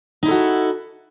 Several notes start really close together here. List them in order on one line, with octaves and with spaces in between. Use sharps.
D#4 E4 A4 F#4